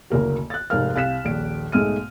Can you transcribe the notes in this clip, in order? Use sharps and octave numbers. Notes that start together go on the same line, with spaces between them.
F#1 D2 A#3 F#4
F#6 A6
F1 G#2 G#4 A#4 F5 F6
C2 F5 F#6 B6 E7
D#1 A#1 D7
B1 G#2 G#3 A3 F6 D#7